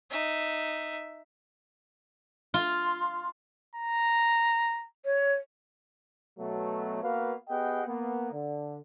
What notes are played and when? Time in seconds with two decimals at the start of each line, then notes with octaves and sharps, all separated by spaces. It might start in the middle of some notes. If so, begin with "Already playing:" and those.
0.11 D#4 E5
2.54 F4
3.75 A#5
5.05 C#5
6.39 B2 F#3 A3
7.03 A#3 B3 F#4 B4 F5
7.49 B3 G4 G#4 D#5 F#5 G5
7.87 A#3 B3
8.32 D3